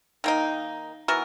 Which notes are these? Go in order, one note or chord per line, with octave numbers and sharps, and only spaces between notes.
D#3 A#3 D#4
E3 B3 F#4 A#4